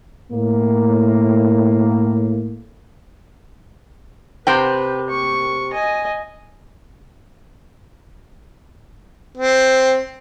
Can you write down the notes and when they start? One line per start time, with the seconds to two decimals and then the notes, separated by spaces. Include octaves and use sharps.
0.32 A2 A#3
4.47 C3 B4 C5 G5
5.10 C#6
5.73 D#5 G#5
9.37 C4